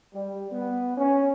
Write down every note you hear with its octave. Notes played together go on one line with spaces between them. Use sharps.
G3
B3
C#4